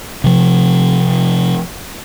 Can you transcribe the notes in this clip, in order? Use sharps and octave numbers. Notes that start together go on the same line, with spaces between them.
C3 F3